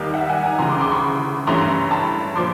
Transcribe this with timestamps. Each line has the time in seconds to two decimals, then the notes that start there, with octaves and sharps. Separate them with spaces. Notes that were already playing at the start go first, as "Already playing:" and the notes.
Already playing: D#2 D#3 G3 A#3 D#5 F5
0.14 E5 F#5
0.29 F#5 G#5
0.44 G#5 A#5
0.58 D2 C#3 E3 A#5 C6
0.70 C6 D6
0.81 C6 D6
0.91 B5 C#6
1.47 G2 E3 A3 C#4 A#5 C6
1.91 A5 B5
2.36 A#2 F3 C6 D6